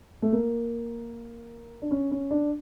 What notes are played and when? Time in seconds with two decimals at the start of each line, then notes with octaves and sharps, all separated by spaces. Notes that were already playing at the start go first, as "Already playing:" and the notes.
0.22 A3
0.32 A#3
1.82 D4
1.91 C#4
2.11 C#4
2.31 D4